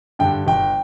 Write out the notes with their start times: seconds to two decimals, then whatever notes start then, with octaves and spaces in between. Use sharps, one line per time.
0.19 G2 D3 G5
0.47 G1 G5